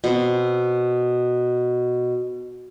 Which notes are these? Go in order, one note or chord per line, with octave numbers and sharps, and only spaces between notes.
B2 C4